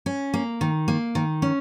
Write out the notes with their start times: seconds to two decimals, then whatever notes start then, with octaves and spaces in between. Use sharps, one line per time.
0.06 C#4
0.34 A#3
0.61 D#3
0.88 A#3
1.15 D#3
1.42 C#4